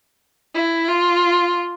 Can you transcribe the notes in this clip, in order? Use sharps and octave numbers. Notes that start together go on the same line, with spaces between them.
E4
F4